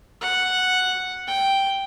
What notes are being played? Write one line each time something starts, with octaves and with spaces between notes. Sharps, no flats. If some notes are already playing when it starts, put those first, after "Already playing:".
F#5
G5